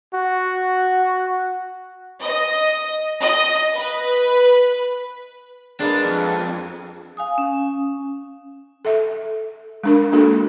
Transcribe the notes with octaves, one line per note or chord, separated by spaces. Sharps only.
F#4
D#5
D#5
B4
G#3 A#3 B3 D4
F2
F5 G#5 D#6
C#4
A4 E5
G#3 D4 A#4
A#3 D4 F#4 A4